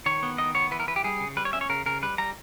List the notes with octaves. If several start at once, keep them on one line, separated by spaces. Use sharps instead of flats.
D#3 C#5
B3
D#3 D#5
B3 C#5
E3 B4
A#4
E3 B4
G4
G3 G#4
C#3
G3 B4
C#5
C#4 E5
C#5
C#3 A#4
C#3 A#4
G3 B4
G3 A#5